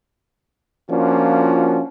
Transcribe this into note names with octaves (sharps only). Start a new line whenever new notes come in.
F3 A#3 C#4 D4 F4 F#4